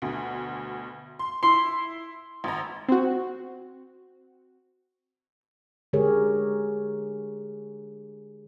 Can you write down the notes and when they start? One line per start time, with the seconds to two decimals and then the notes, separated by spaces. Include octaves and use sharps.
0.02 D2 B2
1.19 C6
1.43 E4 C6
2.44 G#1 A#5
2.88 C4 F#4
5.93 D3 G#3 G4 G#4 A#4 C#5